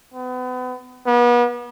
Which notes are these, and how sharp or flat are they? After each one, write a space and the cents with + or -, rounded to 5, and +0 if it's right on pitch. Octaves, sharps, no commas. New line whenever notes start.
B3 +35
B3 -35